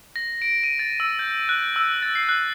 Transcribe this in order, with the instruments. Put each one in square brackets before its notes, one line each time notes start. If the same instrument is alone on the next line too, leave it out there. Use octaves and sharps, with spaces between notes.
[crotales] A#6
D7
D#7
A6
E6
G6
F#6
E6
A6
C7
F#6